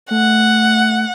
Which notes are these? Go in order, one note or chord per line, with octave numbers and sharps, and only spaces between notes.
A3 F#5